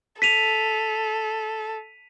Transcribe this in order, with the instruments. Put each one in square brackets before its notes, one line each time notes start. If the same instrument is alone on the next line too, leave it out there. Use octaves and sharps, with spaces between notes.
[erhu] A4 [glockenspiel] B6 D#7 F7